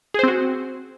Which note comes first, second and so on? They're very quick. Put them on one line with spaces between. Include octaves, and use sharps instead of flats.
G#4 C5 C4 F#4